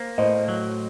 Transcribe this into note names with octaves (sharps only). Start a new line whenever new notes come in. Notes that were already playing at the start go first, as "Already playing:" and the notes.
Already playing: A#3 C5
A2 C5 D#5
F#3